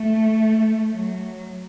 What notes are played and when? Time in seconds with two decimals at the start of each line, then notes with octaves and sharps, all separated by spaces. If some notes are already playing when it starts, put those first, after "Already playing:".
Already playing: A3
0.93 F#3